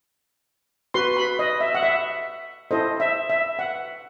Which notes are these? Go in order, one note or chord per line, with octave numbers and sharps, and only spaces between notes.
F#4 B4 C6
B5
D#5
E5
F#5
E5
E4 A4 C5 D#5
E5
E5
F#5